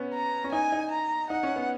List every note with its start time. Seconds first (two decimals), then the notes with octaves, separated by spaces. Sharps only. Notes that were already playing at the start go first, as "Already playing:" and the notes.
Already playing: B3 C#4
0.14 A#5
0.44 C#4
0.52 D#4 G#5
0.72 D#4
0.91 A#5
1.30 D#4 F#5
1.43 C#4
1.56 B3